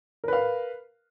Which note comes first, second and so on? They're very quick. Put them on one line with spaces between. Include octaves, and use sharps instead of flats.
A#4 B4 F5